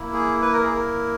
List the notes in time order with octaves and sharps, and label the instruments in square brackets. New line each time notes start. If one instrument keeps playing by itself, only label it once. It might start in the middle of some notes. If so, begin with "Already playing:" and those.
Already playing: [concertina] A#3 E4
G#4
B4
A#4
G#4
A#4